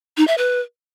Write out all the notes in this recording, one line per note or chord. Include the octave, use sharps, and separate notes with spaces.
D#4
E5
B4